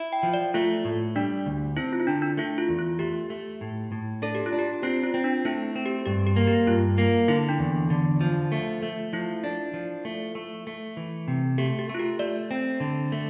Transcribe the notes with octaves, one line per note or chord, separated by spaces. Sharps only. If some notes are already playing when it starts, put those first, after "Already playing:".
Already playing: E4
G5
F3
D5
A3 F4
A2
G3 D4
D2
C4 E4
F4
E4
D3 D4
D4
A3 E4
F4
E2
F4
A3 G4
A3
A2
A2
D4 A4
G4
F4
D4
G4
C4 F4
F4
C4
D4
A3 E4
C4
G4
G2 G4
G4
A#3
G4
G2 F4
A#3
D3 E4
D4
E2
D3
F3
A3
A3
F3 E4
D4
F3
A3
A3
A3
E3
C3
A3 G4
G4
A3
F4
G4
A3 D5
C4
D3
A3